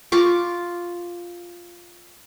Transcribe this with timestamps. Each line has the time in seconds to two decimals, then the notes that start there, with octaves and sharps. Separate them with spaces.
0.12 F4 C#6 D6